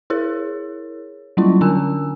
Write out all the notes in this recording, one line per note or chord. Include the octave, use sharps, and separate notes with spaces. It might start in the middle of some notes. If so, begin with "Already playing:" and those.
E4 G#4 A#4 C#5
F#3 G3 A#3 C#4 E4 F4
D3 C#4 D4 A#4 G#5 E6